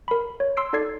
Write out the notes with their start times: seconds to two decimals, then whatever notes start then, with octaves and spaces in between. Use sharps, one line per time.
0.08 A#4 B5
0.40 C#5
0.57 C6 E6 C7 D7
0.73 D#4 A4 D5 G#6 C7